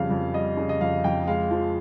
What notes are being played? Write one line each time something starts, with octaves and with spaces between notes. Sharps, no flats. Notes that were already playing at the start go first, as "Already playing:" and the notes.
Already playing: F2 C#3 G3 F5
F2
G3 D#5
C#3
D#5
F2 F5
F2 G5
G#3 F5
F3